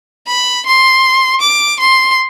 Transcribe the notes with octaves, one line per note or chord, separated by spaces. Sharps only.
B5
C6
D6
C6